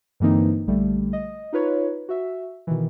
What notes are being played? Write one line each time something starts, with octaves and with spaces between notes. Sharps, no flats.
G2 D3 E3 A#3 C4 D#4
A#1 D3 G3 A3
D#5
D#4 F4 B4 C#5
F#4 E5
B2 D#3 E3